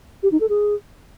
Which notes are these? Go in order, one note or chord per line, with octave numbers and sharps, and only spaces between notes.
G4
D#4
A4
G#4